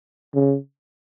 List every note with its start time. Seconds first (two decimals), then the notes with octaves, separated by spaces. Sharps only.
0.34 C#3